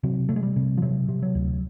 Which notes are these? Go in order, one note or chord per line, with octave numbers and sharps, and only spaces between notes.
C3 F#3
C3 A3
G#3
G3
C3
F3
C3 F#3
C3
F#3
D2